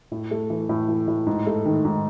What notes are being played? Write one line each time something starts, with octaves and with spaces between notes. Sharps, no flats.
A2
A3
E3
A2
E3
A2
G#2
A3
D#3
G#2